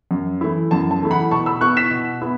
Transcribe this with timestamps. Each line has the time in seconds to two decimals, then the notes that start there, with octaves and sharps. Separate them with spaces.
0.11 F#2
0.41 E3 A3 E4
0.71 F#2 A5
0.91 A5
1.02 E3 A3 E4
1.11 F#5 B5
1.31 B2 A5 C#6
1.46 B5 E6
1.61 B3 E4 C#6 F#6
1.77 B6 E7
1.91 B2
2.22 B3 E4